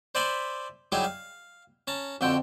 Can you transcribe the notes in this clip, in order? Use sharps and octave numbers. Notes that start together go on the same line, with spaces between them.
C5 D5 E5 G#5 B5 C6
F#3 G3 D#4 E4 G#4 E5
F5
C#4 A5 A#5
F2 D3 C4 F#4 G5